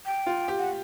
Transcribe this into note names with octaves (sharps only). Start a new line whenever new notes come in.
G5
F4
G4
F#5